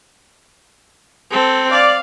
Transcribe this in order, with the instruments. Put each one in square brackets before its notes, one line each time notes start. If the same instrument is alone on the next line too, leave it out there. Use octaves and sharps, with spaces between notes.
[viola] C4 A4
[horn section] D5 [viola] F5